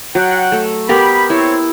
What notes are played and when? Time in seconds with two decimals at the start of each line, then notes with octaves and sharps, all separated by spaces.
0.15 F#3 F#5 G5
0.52 A3
0.89 B3 G4 A#4 B5
1.30 C4 E4 C#5